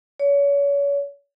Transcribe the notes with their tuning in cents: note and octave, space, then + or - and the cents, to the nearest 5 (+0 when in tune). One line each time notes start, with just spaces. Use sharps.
C#5 +35